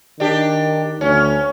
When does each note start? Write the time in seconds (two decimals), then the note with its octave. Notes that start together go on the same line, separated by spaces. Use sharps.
0.20 D#3 D4 G4
1.01 D2 C#4